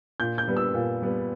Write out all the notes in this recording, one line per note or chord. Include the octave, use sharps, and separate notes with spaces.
A#2 G6
G6
G3 B3
E6
A#2
G3 B3